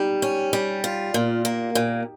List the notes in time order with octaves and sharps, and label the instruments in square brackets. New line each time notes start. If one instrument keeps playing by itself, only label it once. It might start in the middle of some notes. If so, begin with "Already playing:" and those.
Already playing: [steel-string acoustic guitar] G3 [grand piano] D#4 G4
[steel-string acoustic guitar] C#4
G3
F4
A#2
A#3
A#2